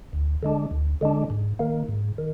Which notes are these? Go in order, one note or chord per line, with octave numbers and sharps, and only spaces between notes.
D2
D3 G#3 D4
D2
D3 G#3 D4
G#2
D#3 A#3
G#2
D#3